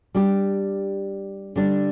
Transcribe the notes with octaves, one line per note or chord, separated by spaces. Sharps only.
G3 D4 G4
D3 G3 D4